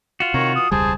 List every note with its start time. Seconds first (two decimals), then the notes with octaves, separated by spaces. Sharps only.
0.20 F4 F#4
0.34 C3 D#3 C#5 A#5
0.56 E3 D#6
0.72 E1 C#2 G3 G#4 C5 A5